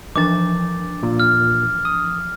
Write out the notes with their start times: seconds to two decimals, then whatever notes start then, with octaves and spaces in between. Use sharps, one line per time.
0.16 E3 F3 D4 D6 A6
1.03 A#2
1.20 F6
1.85 D#6